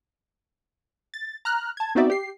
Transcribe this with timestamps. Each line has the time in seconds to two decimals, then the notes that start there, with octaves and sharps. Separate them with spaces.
1.14 A6
1.45 A#5 F6 F#6
1.77 A5 G#6
1.95 B3 C4 D#4 F#4 D5 E5
2.10 G4 C7